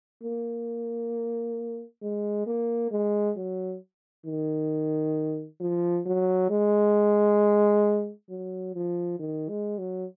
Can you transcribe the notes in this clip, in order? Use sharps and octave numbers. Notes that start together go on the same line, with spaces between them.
A#3
G#3
A#3
G#3
F#3
D#3
F3
F#3
G#3
F#3
F3
D#3
G#3
F#3